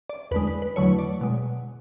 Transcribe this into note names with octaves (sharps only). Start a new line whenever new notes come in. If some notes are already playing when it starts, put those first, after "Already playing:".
D5
E2 D3 G#3 B4
B4
B4
E2 D3 F#3 A3 C#5
D5
B2 G#3